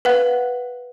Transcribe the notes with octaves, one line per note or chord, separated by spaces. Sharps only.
B4 F5 F#5 F#6